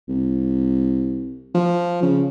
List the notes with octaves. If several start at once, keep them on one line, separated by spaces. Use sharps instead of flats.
C2
F3
C#3